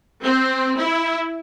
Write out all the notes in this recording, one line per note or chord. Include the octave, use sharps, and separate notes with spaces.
C4
E4